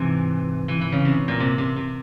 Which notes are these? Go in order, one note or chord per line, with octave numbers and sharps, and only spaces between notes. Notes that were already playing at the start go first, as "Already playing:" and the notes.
Already playing: G#2 C3 E3
E3
E3
C#3
C3
A#2
C3
C3
C3